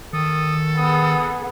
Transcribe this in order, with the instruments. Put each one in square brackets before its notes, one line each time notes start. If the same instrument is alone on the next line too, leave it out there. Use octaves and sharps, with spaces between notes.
[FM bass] D#3 [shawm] A4 [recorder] D#6
[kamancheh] B3 G#4 [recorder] D#6